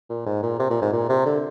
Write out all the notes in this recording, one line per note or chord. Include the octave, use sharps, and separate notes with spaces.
A#2
G#2
A#2
C3
A#2
G#2
A#2
C3
D3